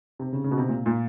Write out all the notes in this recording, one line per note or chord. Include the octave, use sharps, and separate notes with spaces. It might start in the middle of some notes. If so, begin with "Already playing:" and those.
C3
C#3
C#3
B2
C3
A#2
A#2